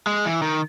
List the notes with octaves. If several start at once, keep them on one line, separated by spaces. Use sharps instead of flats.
G#3
E3
D#3